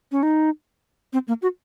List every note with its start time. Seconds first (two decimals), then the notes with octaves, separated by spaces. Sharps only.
0.12 C#4
0.23 D#4
1.13 C4
1.28 A#3
1.42 F#4